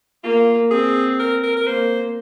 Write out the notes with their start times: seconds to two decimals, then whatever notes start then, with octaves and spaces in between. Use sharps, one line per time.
0.23 A#3 F4
0.71 C4 G#4
1.20 A#4
1.43 A#4
1.57 A#4
1.67 A#3 C5